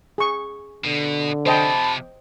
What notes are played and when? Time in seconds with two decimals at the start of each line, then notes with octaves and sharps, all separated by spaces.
0.18 G#4 C#6
0.84 B2 D3
1.46 C3 F3 C5 D#5 G5 A5 B5